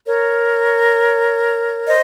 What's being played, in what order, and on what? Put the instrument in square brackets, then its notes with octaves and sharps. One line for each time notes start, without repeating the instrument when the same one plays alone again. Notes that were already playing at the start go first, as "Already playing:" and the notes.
[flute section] A#4 C#5
C5 D#5